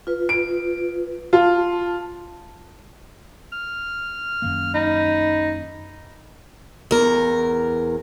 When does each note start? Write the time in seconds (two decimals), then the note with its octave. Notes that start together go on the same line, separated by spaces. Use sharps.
0.07 F4 B4
0.29 D7
1.33 F4 A5
3.52 F6
4.42 F#2 D#3 A#3
4.74 D#4 B5
6.91 E2 A#4